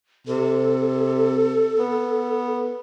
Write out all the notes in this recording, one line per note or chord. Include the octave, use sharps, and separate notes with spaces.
C3 A4
B3